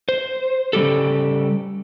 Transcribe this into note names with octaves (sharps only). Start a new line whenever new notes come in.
C5
C#3 G3 G4 A4